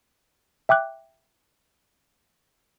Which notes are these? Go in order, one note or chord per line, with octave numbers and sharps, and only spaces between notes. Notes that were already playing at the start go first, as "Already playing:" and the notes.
E5 G5 D6 F#6